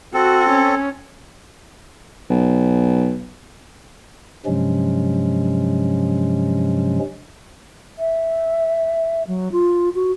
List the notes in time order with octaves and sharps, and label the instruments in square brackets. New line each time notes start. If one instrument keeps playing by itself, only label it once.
[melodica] C4 A4 [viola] F#4
[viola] C#4
[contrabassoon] B1
[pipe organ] G2 C3 F3 F#3 G#3 C#4
[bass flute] E5
F#3
F4
F#4